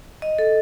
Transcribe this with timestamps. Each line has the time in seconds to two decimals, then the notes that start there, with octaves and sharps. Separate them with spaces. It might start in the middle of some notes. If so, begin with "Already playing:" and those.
0.22 D#5
0.38 A4